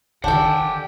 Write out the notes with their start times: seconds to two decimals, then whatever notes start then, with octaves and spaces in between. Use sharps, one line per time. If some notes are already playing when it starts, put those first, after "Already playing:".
0.24 D#3 D4 G4 A4 F#5 G5